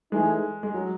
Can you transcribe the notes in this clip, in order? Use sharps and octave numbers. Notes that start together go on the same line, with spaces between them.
E3 G#3 A3 D#4 G#4
G#3
F#3